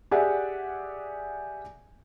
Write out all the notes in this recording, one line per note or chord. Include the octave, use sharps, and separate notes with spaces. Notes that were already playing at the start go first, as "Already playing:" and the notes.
G4 G#4 D5 E5 F#5